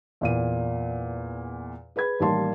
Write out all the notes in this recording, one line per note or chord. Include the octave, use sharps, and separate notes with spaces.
E2 A#2 D#7
G#4 B4 B5 G#6
A1 D#3 G3 A#3 A5 C6